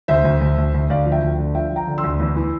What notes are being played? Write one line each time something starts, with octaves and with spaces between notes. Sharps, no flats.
D2 C5 E5
D2
D2
D2
D2
D2 D5 F5
F3
E5 G5
D2
D3
F3 E5 G5
F3
G5 A#5
D3
C6 E6
D2
E2
E3